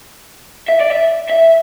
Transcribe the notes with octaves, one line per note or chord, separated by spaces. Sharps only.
E5
D5
E5
E5